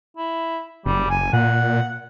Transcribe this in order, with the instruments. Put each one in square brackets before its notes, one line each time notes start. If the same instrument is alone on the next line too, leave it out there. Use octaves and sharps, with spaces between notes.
[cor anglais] E4
[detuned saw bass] F#1 [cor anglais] G3
[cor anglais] G#5
[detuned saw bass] A#2 [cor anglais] F#5